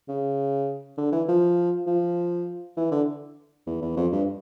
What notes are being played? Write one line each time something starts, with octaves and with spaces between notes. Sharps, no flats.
C#3
D3
E3
F3
F3
E3
D3
E2
E2
F2
G2